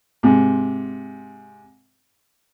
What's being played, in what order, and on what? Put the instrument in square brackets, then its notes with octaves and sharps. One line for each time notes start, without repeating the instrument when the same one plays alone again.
[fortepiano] G#2 C3